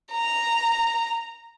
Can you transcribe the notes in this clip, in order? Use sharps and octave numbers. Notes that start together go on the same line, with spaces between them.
A#5